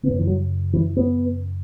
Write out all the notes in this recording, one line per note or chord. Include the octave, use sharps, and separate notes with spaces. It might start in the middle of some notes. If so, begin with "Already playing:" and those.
C#3 B3
F#2
E3
F#3
E3
B3